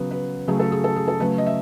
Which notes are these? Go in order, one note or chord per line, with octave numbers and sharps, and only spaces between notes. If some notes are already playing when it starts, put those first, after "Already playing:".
Already playing: C#3 F#3 B3
B4
C#3 F#3 A3 G#4
A4
G#4
A4
G#4
A4
C#3 F#3 A3 B4
D#5
E5